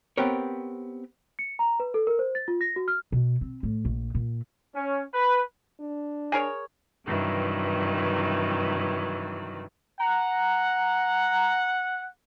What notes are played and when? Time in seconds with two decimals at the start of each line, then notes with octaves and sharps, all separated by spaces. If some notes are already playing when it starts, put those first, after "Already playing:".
0.17 B3 C4 G4 A#4 C#5
1.39 C#7
1.59 A#5
1.80 B4
1.94 A4
2.07 A#4
2.19 C5
2.35 A6
2.48 F4
2.61 A#6
2.76 F#4
2.88 F6
3.12 B2
3.41 C4
3.63 A2
3.85 A#1
4.15 A#2
4.75 C#4
5.14 B4
5.80 D4
6.32 G#4 A#4 C#5
7.06 G2 C3 D#3 E3 F#3
10.00 F#5 A#5